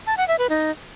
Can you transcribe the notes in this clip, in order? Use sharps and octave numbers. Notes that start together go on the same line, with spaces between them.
A5
F#5
E5
B4
D#4